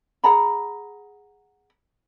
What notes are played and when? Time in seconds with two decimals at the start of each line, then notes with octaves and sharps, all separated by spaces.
0.24 G#4 F#5 A#5 B5